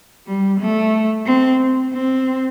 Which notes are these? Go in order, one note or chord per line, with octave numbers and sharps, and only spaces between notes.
G3
A3
C4
C4